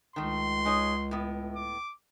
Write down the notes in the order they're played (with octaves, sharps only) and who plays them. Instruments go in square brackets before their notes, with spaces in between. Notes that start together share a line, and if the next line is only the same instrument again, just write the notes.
[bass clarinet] C#2 [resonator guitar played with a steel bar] D#3 A3 [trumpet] C6
[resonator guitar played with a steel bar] G#3 D#4 C#5
A2 B3
[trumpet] D6